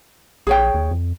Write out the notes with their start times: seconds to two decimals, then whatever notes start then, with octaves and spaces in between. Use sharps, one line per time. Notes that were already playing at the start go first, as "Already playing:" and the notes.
0.47 A#1 G#4 C#5 G5
0.74 D#2
0.91 F2